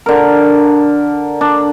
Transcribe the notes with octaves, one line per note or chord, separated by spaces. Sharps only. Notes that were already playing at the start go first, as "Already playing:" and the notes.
D3 A#4
D4